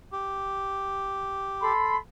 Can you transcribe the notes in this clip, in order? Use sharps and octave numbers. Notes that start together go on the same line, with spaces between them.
G4
A4 B5 C6